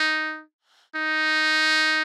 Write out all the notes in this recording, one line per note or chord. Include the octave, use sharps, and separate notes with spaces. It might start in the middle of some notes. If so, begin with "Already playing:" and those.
Already playing: D#4
D#4